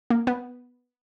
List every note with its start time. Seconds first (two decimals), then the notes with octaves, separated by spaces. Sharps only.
0.10 A#3
0.27 B3